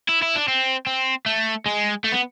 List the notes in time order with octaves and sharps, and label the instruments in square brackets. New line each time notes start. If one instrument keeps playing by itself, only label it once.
[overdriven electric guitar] E4
E4
D4
C4
C4
A3
G#3
A3
B3